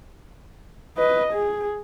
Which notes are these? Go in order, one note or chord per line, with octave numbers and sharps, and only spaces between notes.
B4 D#5
G#4